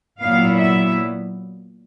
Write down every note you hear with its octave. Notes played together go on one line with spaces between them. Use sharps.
A#2 F#3 B3 E4 F5
E5